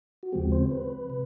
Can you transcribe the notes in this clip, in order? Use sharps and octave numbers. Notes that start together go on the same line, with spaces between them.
F#4
D#2 C#3 F3 G#3 C4 G4
C5
B4
C3